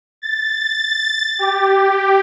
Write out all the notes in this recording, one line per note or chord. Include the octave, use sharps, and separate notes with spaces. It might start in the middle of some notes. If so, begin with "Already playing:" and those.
A6
G4